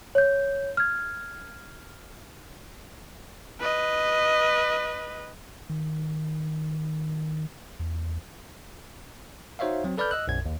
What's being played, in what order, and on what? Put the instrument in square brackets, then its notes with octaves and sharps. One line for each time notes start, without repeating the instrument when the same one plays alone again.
[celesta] C#5 G6
F6 G#6
[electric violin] B4 D#5
[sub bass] D#3
E2
[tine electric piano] D#4 F#4 C5 C#5 E5 F5
F#3 C4
A4 B4 D5 B5 F6 G6
D#5 E6 F#6
B1 F#2 G#6
D#2